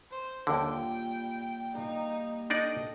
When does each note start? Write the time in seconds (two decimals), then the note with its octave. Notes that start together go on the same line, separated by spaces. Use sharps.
0.11 C5
0.47 D#2 A#2 D3 G3 G5 G#5
1.74 G3 A#3 D#4 G4
2.50 D4 D#4 A4 D5 D#5